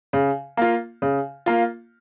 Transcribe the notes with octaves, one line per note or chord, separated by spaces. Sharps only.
C#3
A#3 F4
C#3
A#3 F4